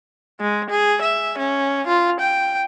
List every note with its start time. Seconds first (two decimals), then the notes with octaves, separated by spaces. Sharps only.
0.40 G#3
0.70 G#4
1.02 E5
1.38 C#4
1.87 F4
2.20 G5